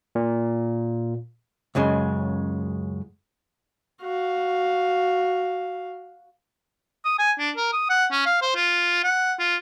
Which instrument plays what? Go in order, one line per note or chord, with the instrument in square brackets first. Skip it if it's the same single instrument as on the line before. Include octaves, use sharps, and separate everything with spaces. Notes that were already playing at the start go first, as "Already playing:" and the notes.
[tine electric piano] A#2
[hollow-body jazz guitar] C#2 F#2 C#3 G#3
[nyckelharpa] F#4 F5
[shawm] D#6
G#5
D4
A#4
D#6
F#5
C#4
F5
C5
F4
F#5
F4